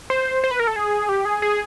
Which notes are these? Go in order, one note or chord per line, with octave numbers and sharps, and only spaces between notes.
C5
C5
B4
A#4
A4
G#4
G4
G#4
G#4